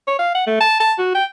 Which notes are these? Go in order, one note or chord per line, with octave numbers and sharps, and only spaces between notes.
C#5
F5
F#5
A3
A5
A5
F#4
G5